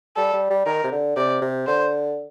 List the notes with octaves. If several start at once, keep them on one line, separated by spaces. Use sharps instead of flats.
G3 A4
G3
G3
D#3 A#4
C3
D3
C3 D5
C3
D3 C5